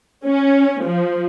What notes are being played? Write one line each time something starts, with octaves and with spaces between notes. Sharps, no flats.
C#4
F3